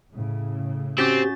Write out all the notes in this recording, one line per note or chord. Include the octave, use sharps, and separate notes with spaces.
A2 C#3
C4 C#4 F#4 G4 A6